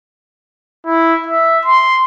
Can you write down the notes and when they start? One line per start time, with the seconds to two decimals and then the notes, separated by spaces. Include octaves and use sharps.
0.86 E4
1.27 E5
1.66 C6